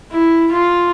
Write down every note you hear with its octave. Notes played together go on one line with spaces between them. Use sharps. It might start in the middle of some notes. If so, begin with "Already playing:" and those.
E4
F4